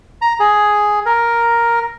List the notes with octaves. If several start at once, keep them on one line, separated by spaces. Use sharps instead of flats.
A#5
G#4
A#4